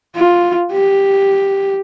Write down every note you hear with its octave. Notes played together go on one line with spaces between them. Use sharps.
F4
G4